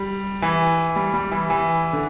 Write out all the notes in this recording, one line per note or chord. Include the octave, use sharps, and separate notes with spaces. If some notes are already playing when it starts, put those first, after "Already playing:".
Already playing: G3
E3
G3
G3
E3
E3
D3